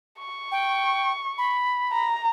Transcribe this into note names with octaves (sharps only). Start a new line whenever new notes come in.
C#6
G5
B5
A#5